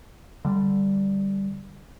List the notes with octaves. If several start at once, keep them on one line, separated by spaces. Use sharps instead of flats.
D3 G3